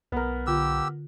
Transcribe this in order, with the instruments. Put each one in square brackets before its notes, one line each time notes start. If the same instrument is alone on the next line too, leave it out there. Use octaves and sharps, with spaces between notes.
[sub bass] B1 [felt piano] B3 A#4
[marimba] D3 F4 [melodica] G4 E6